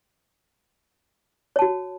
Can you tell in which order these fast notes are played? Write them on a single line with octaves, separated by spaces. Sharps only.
C#5 A5 F#4